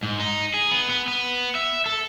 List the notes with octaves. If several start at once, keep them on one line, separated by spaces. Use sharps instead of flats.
G#2
D#4
G#4
B3
B3
B3
E5
A4